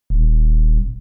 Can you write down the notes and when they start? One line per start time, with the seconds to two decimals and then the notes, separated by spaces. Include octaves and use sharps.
0.10 D#1